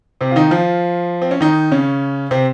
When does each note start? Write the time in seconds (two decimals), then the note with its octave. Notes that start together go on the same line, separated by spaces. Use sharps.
0.21 C3 C4
0.31 F4
0.36 D#3 D#4
0.51 F3 F4
1.22 C4
1.31 C#4
1.41 D#3 D#4
1.71 C#3 C#4
2.31 C3 C4